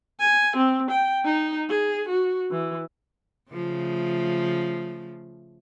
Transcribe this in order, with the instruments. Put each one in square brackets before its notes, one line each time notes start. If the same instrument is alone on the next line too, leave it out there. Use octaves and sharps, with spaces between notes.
[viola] G#5
C4
G5
D#4
G#4
F#4
E3
[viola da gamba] C#3 F3 A3